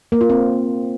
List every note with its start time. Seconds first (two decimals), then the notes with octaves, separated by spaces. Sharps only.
0.12 A#3
0.21 F4
0.30 C4